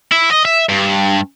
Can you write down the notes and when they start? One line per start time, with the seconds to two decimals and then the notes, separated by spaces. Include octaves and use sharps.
0.12 E4
0.31 D#5
0.45 E5
0.69 G2